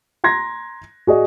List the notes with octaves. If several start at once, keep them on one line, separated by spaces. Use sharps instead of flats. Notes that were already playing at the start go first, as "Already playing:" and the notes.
A#5 C6 G#6 A#6
F#4 G#4 D5 D#5